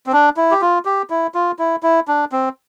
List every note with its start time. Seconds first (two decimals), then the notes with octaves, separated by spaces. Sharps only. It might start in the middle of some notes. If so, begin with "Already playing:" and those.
0.07 C4
0.12 D4
0.37 E4
0.51 G4
0.62 F4
0.85 G4
1.10 E4
1.34 F4
1.59 E4
1.83 E4
2.08 D4
2.32 C4